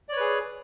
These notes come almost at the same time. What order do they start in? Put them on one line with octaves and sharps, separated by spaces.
D5 C#5 B4 G#4